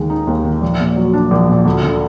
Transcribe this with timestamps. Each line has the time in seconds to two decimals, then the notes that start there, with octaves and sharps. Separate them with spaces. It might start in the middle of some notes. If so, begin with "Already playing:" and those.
Already playing: D#2 D#3 G#3
0.10 D#4
0.27 D#2
0.44 D#3
0.62 A#1
0.80 A#2
0.96 F#3
1.13 D4
1.31 A#1
1.49 A#2
1.65 D2
1.83 D3